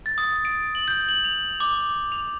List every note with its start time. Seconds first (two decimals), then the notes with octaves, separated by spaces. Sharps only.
0.06 A6
0.18 D#6
0.45 D7
0.75 F#7
0.88 G6
1.09 F#7
1.25 F7
1.60 D6
2.12 F7